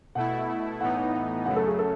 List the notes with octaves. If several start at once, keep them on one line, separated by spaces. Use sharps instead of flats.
B2 A3 E4 F#5
A2 E3 B3 D#4 F#5
F#5
F#5
F#2 C#3 F#3 A3 F#5
A4
G#4
A4